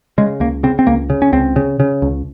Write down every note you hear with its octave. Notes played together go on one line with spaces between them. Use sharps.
C#3 G#3
C#2 A#3
C#3 C4
C4
C#2 A#3
C#3
C#4
C#2 C4
C#3
C#3
C#2